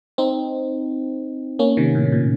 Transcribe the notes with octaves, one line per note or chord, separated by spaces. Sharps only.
C4 D#4
A#3 C#4
C3 D#3
A2
C3
A#2